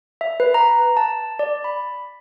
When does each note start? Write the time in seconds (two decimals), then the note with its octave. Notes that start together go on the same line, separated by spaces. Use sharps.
0.21 E5
0.40 B4
0.54 A#5
0.97 A5
1.39 D5
1.64 B5